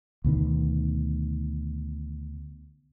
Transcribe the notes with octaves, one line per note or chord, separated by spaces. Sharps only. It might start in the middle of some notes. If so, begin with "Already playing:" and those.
D2 B2 D#3